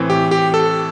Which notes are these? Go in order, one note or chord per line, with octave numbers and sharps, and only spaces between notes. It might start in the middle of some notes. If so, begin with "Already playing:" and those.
Already playing: A2 E3 C4
G4
G4
A4